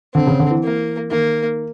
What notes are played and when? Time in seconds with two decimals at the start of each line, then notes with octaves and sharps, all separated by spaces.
0.14 D3 C4
0.27 C#3
0.39 D3
0.51 E3
0.64 A#3
1.11 D#3 A#3